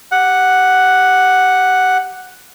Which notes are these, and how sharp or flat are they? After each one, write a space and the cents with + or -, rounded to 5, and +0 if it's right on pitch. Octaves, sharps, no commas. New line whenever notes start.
G4 +0 F#5 +0